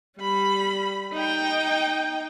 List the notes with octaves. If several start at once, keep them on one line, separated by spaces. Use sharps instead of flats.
G3 B5
D#4 G5